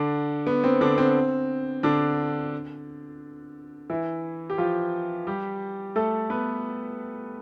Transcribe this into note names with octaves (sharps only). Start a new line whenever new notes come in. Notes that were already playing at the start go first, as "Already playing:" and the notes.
Already playing: D3 D4
B3
C4
D3 D4
C4
D3 D4
E3 E4
G4
F3 F4
G3 G4
A3 A4
B3 B4